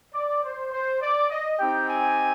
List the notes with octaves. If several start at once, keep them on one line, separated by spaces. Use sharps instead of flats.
D5
C5
C5
D5
D#5
C4 D#4 G4 G5
G#5